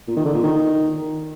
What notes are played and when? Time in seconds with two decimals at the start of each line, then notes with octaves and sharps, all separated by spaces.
0.08 A#2
0.16 D#3
0.25 D3
0.34 A#2
0.43 D#3